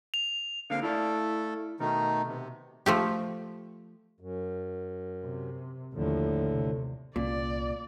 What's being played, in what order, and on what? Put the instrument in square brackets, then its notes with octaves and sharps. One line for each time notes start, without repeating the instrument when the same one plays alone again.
[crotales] F7
[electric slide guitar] D3 A#3 C4 [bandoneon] F5
[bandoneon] A3 A4 [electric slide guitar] E4 D5 F5
[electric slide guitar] B2 [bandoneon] D#3 A3 D#4
[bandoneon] C3
[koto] F3 A3 G4
[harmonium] F#2
[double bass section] C3
[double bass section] A1 D#2 F3 [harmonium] A2 D3
[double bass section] C3
[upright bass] C2 C#4 [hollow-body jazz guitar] A#2 [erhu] D5